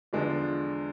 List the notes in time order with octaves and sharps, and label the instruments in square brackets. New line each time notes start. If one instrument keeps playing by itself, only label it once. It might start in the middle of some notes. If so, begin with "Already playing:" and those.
[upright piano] E2 D3 F3 G#3 D4